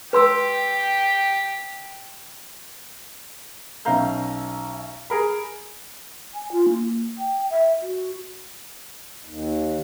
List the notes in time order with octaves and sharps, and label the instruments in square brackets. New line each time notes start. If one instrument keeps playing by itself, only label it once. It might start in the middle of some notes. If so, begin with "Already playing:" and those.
[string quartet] G4 [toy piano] B4 C6 E6
[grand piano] B1 C#4 E5 F5 A#5 G6
G#4 A#4 B5
[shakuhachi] G#5
F4
A#3
G5
E5
F#4
[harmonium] D#2